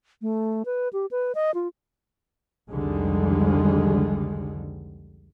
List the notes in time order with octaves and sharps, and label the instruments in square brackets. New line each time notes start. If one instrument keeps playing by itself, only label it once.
[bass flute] A3
B4
G4
B4
D#5
F4
[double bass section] C2 F2 D3 D#3 G3 G#3